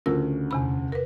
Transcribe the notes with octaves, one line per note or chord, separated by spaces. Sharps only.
D2 C#3 F4 A#4 E6
E2 C3 B5
A#4 B4